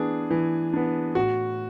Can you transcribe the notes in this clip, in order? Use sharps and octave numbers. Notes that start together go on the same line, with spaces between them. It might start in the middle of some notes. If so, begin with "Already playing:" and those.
Already playing: E3 B3 D4 G#4
E3
B3 D4
A2 F#4